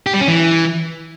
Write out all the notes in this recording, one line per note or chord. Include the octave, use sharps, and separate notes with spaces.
G4
G3
C#4
E3